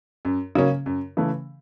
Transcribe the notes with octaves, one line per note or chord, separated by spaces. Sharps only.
F#2
C#3 F#3 A#3 C#4
F#2
C#3 E3 A3